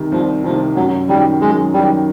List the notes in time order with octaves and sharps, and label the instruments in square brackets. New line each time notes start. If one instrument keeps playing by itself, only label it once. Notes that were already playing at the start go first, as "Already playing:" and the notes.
Already playing: [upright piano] C2 C3 D#3
[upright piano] C2 [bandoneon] F3
[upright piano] C3 D#3 [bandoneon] F3
[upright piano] F#2 [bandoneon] F#3
[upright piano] D#3 F#3 [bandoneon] G3
[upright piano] F#2 [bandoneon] G#3
[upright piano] D#3 F#3 [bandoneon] G3